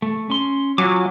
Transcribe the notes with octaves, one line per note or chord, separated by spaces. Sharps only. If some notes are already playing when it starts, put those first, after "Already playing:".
A3
C#4 C6
F#3 F4 G#5 D6